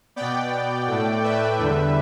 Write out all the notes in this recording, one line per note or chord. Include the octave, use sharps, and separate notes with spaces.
B2 B3 D5 G5
A2 A3
B4 E5
E2 D3 G3